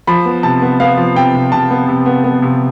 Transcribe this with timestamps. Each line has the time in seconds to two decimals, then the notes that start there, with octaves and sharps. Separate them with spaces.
0.07 F3 B5
0.25 B3
0.43 C3 A5
0.62 B3
0.80 B3 F5
0.97 F3
1.16 C3 G5
1.34 C3
1.52 C3 A5
1.70 B3
1.88 C3
2.06 B3
2.24 B3
2.42 C3